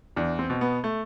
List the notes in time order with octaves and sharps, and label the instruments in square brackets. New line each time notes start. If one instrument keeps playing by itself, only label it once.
[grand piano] E2 D4
C4
B2
B3
A3